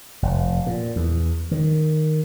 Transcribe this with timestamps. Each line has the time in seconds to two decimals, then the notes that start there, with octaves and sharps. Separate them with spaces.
0.22 F1
0.67 A#2
0.96 E2
1.51 D#3